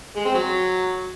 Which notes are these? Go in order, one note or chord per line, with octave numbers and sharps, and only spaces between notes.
G#3
C4
F#3